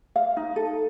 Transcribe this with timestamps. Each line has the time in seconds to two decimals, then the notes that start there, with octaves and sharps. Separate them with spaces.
0.16 F5
0.37 D#4
0.56 A4